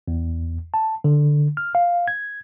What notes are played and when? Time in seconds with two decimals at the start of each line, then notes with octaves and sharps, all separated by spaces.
0.08 E2
0.74 A5
1.04 D3
1.57 F6
1.75 F5
2.08 G#6